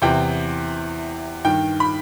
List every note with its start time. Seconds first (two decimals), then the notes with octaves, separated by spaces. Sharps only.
0.02 E2 C3 E3 G5
1.44 G2 D#3 G5
1.80 B5